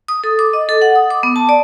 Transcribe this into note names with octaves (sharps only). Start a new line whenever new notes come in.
D#6
A4
D6
D#5
A4
F#5
D#6
D6
B3
A5
D5